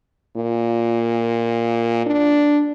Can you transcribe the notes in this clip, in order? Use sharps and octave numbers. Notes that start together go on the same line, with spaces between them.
A#2
D4